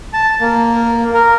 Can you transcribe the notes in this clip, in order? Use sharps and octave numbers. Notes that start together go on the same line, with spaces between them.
A5
A#3
A#4